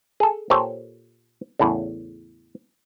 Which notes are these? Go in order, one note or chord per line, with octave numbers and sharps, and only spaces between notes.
G#4 A4
A#2 G4 A4 C5 C#5
E2 A2 C#3